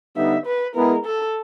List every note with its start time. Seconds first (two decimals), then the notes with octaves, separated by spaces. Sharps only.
0.16 D3 G3 B3 D#4 E5
0.46 B4
0.75 G#3 B3 E4 G#4 A#4 B4
1.06 A4